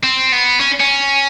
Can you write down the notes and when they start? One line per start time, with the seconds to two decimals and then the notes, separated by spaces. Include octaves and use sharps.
0.03 C4
0.32 B3
0.60 C#4
0.80 C#4